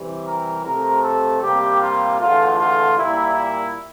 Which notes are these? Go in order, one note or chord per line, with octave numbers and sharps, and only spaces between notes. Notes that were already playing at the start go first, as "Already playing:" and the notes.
Already playing: C3 E3 G3
A#4
C3 F3 A3 C4 A#4
A4
C3 G3 A#3 G4
F4
E2 D3 A3 F4
F4
A#2 G3 A#3 E4
E4